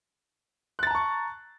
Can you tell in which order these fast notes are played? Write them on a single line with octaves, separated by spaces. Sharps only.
F#6 A6 A#5 A5 C#6